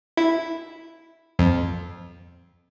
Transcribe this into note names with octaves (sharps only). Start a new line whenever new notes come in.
E4
F2